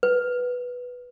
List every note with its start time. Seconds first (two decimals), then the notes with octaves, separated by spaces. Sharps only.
0.03 B4